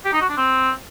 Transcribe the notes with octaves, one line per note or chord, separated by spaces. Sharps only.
G4
D#4
F#4
D4
C4